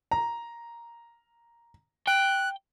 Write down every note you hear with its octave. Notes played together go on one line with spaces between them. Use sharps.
A#5
G5 F#6